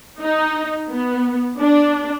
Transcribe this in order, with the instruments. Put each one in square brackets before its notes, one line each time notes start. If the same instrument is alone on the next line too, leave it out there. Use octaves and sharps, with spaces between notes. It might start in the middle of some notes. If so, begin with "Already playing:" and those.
[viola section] D#4
B3
D4